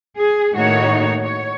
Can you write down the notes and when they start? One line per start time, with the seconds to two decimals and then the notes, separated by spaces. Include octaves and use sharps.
0.17 G#4
0.54 A2 D#3 A#3 D#4 F#4 C#5
1.25 C#5